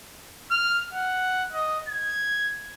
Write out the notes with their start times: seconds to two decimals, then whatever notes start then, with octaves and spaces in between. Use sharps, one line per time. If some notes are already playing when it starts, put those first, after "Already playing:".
0.51 F6
0.93 F#5
1.53 D#5
1.88 G#6